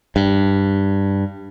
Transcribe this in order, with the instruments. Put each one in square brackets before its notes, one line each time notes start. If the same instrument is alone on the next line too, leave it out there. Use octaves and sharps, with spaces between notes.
[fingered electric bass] G2